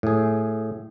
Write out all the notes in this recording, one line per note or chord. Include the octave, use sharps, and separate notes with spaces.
A2 G#4